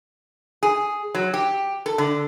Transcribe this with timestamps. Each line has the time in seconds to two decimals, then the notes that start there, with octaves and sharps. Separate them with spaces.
0.63 G#4
1.15 F#3
1.34 G4
1.86 A4
1.98 D3